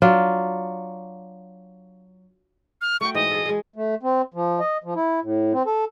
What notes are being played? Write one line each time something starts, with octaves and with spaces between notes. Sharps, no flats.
F#3 D4 F4
F6
A3 F#4 G5 C#6
G#2 E3 D#5
G#4 A4
G#3 G#4
A3
C4
F3
D#5
F3
E4
A2
C4
A4